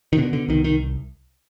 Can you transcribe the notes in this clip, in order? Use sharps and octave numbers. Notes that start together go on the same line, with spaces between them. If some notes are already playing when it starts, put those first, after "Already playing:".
D#3
B2 D3
D3
C2 D#3
D#3